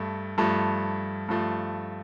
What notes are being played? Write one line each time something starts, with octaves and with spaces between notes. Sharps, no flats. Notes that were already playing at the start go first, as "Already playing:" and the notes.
Already playing: G2 A3
G2 F3 A3
G2 F3 A3